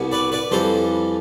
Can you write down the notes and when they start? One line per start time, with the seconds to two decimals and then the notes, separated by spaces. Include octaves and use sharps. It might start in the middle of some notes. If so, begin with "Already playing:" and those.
Already playing: C2 B2 G3
0.12 B4 D5
0.32 B4 D5
0.51 F2 E3 G3 A4 C5